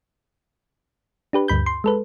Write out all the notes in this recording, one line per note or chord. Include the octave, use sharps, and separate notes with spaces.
D4 G4 B4
D2 G2 B5 G6
C6
G#3 A4 B4